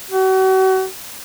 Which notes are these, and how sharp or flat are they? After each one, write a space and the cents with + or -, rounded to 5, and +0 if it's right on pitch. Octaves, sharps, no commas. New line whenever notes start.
F#4 +40